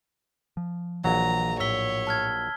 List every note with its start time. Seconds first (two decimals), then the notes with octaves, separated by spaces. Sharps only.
0.57 F3
1.04 A#1 E3 F#3 A#5
1.60 A2 C#5 E6 B6 G7
2.07 A5 F6 G#6